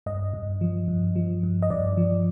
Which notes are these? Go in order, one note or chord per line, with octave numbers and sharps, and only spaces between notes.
G2 D#5
G2
F3
G2
F3
G2
D#5
G2 D5
F3